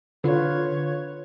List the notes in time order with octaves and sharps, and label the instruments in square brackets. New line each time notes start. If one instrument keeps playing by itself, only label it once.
[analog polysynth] D3 [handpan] F4 B4 [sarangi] C#5